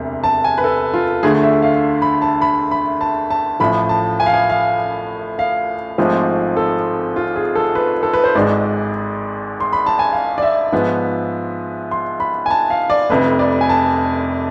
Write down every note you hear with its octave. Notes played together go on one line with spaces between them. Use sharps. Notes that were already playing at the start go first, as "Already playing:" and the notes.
Already playing: E1 D2 C3
A5
G#5
B4
A4
F4
D2 D3 A3 G#4
E5
F5
B5
A5
B5
B5
A5
A5
A1 A2 F3 B5
A5
G#5
F5
G#5
F5
F5
G#1 G#2 F3 A3 C4
A4
F4
G#4
A4
B4
A4
B4
C5
G#1 G#2 G#3 D5
C6
B5
A5
G#5
F5
D5
E5
G#2 F3 B3
C6
B5
G#5
A5
F5
D5
F1 F2 C3 B4
D5
G#5
A5